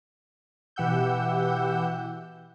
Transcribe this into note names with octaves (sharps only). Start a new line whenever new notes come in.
B2 E3 G4 F#5 E6 G6